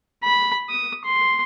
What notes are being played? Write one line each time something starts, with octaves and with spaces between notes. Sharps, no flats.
B5
D#6
C6